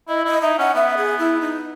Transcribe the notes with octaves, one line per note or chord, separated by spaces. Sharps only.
E4 D#5
E4 D#5
D#4 E5
C#4 F#5
B3 E5
G#4
E4
D#4